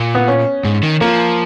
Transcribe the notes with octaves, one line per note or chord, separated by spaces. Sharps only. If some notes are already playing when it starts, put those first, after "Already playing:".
Already playing: A#2
B3
C#4
G#2
D#3
F3 A#3